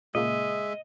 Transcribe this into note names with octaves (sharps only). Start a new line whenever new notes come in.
A#2 C#3 G#3 A#3 D#5 E5